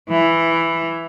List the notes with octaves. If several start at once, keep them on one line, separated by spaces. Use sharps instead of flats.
E3